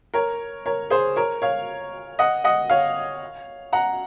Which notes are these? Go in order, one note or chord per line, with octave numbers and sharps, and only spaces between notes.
A#4 C#5
A#4 C#5
G#4 C5
A#4 C#5
C#5 F5
D#5 F#5
D#5 F#5
C#5 F5
F#5 A#5